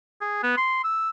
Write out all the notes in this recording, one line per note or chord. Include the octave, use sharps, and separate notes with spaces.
G#4
B3
C6
E6